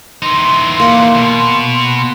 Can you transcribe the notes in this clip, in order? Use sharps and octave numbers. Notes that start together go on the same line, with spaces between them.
E3 D#4 C6
A#3 F#5
B2